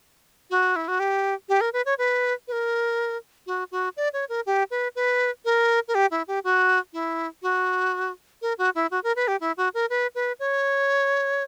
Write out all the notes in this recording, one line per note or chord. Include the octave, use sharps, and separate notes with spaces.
F#4
E4
F#4
G4
G4
A#4
B4
C#5
B4
B4
A#4
F#4
F#4
D5
C#5
A#4
G4
B4
B4
A#4
A#4
G4
E4
G4
F#4
E4
F#4
A#4
F#4
E4
F#4
A#4
B4
G4
E4
F#4
A#4
B4
B4
C#5